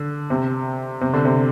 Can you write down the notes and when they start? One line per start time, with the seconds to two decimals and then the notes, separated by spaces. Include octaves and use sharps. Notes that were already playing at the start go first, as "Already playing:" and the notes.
Already playing: D3
0.30 C3
1.01 C3
1.14 D3
1.25 C3